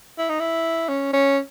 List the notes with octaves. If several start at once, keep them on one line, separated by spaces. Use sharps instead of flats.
E4
D#4
E4
C#4
C#4